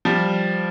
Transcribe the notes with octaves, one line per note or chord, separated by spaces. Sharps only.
F3 G3